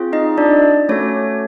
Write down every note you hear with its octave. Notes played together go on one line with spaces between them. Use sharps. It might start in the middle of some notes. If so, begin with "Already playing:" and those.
Already playing: C4 F4 G#4
D#4 D#5
D4 D5
A3 C#4 F#4 A4 C#5